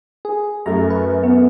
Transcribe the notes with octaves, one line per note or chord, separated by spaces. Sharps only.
G#4
F#2 A3 A#5
B4
B3